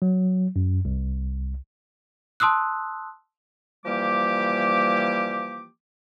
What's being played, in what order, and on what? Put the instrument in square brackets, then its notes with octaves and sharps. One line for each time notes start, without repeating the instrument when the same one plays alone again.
[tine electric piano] F#3
F#2
C2
[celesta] A5 C6 D#6 E6 F#6
[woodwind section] E3 F3 G3 A#3 G4 D6